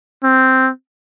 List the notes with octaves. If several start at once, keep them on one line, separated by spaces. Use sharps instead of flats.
C4